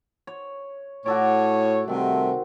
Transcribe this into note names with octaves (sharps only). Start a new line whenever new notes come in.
C#5
A2 F#4 A4 C#5 D5
C3 D#3 G3 A3 C4 F#4